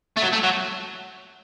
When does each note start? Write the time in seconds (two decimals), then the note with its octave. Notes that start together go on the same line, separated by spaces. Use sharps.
0.17 A3
0.22 F#3
0.33 A3
0.44 F#3